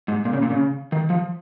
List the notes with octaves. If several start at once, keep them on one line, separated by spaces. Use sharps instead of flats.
G#2
A#2
C#3
A#2
C#3
D#3
F3